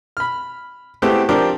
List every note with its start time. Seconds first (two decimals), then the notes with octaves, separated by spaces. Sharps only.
0.17 B5 F6
1.02 G#3 A3 B3 C4 E4 G4
1.29 F3 C4 D4 G4 A#4